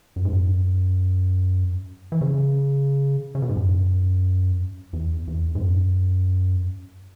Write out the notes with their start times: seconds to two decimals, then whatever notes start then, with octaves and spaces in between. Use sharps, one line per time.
0.16 F#2
0.25 G#2
0.33 F#2
2.12 E3
2.21 C#3
3.35 C#3
3.42 B2
3.49 G#2
3.57 F#2
4.93 E2
5.28 E2
5.55 G#2
5.61 F#2